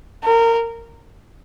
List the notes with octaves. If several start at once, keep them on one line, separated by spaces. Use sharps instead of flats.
A#4